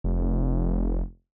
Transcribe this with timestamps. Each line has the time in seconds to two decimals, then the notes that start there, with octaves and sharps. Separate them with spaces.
0.04 F1